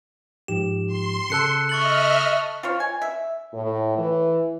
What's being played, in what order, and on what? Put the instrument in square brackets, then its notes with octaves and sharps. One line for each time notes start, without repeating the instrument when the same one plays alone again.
[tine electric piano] G#2 F3 G4 [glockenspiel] E7
[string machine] C6
[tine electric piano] C#3 A4 E6 [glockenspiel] A5 F#6 C#7
[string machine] D#5 E5 F6 [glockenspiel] C#6 A6 F#7
[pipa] F4 C5 C#5
G#5
E5
[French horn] A2
E3